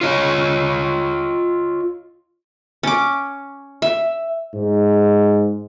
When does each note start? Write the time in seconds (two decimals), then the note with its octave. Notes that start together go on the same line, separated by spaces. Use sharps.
0.01 F4 C#5 D#5
2.83 C#4 D6
3.82 E5
4.54 G#2